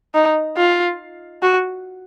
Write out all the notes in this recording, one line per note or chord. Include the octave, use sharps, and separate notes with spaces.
D#4
F4
F#4